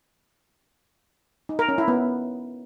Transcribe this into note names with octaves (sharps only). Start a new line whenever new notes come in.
D#4
A#4
C#4
E4
B3